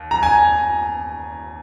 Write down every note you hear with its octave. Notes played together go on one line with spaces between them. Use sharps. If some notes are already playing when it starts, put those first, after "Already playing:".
Already playing: D#2
A#5
G#5